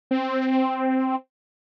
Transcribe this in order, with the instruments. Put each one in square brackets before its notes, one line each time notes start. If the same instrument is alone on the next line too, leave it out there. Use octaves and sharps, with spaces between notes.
[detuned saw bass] C4